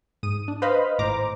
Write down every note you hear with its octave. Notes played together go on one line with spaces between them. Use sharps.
G#2 D#6 D#7
D4
B4 C5 D#5 F5 B5
G#1 A2 C5 A#5 D6